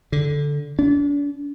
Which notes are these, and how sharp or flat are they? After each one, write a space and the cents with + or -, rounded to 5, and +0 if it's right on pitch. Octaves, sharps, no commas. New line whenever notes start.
D3 -10
D4 -40